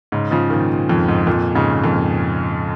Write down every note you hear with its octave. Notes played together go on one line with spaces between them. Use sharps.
G#2 C#3
C#3 F3
A#2 D#3
F2
G#2
F2 A#2
G#2 C#3
F2 A#2